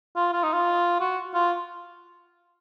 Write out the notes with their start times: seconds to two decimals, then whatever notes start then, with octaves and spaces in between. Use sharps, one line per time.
0.16 F4
0.33 F4
0.43 D#4
0.53 F4
1.01 F#4
1.34 F4